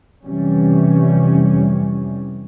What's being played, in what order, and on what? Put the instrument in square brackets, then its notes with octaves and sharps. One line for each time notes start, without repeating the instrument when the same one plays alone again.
[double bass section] F2 C3 E3 G3 C#4